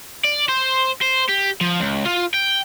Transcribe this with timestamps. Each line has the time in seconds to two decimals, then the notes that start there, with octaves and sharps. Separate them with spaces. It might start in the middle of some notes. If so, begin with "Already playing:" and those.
0.24 D5
0.49 C5
1.02 C5
1.28 G4
1.61 F3
1.81 C#2
2.06 F4
2.34 G5